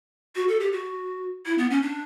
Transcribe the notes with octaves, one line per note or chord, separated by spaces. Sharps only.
F#4
A4
G4
F#4
E4
B3
C#4
D4